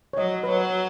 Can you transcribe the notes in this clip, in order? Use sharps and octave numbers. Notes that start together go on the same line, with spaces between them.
C#5
F#3 D#5
B4
F#3 C#5